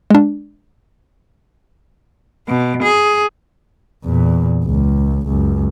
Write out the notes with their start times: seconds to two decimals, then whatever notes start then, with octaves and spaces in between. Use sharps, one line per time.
0.11 G#3 D4
2.48 B2
2.82 G#4
4.04 E2 A#2
4.65 C#2
5.27 C#2 F#2